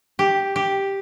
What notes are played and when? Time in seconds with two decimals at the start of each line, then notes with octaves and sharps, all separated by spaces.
0.19 G4
0.56 G4